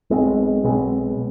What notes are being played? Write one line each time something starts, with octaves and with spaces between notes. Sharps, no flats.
B1 B2 G#3 C4
B1 B2 G#3 C4